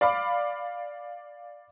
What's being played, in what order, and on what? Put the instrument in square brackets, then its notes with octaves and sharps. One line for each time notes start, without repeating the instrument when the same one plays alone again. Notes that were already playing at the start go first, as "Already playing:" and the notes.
[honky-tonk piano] D5 F5 B5 D6